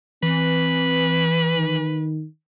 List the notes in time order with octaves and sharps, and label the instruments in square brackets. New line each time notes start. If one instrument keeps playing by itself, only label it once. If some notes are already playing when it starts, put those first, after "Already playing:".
[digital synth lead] E3 [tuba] C4 [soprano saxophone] B4
[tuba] D#3